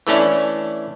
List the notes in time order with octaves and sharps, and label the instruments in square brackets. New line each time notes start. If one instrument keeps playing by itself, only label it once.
[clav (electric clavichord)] E3 A3 C#4 D4 E4